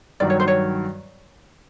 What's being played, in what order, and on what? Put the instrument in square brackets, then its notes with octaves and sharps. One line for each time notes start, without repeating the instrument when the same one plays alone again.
[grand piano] G2 D#3 F#3 [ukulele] D5
[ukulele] C#5
C5
C#5